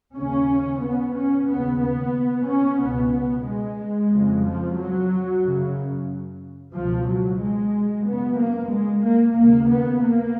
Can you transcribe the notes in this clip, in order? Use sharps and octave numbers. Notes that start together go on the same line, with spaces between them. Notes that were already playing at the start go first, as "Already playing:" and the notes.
D#2 C#3 C#4
B3
C#4
D#2 C#3 B3
B3
C#4
C#2 B2 B3
B3
G#3
F2 C#3
F3
F#3
F#2 C#3
C#2 B2 F3
F#3
G#3
F#2 C#3 B3
A#3
G#3
A#3
D#2 C#3 A#3
B3
A#3